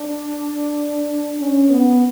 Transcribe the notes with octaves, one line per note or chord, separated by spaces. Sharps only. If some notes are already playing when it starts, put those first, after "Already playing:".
Already playing: D4
C#4
B3